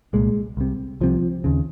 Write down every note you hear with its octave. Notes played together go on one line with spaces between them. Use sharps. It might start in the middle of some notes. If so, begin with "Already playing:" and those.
C2 A#2 G#3
C2 C3
C2 C3 F3
D#2 C#3